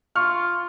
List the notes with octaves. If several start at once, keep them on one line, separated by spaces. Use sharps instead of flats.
F4 C#6 F6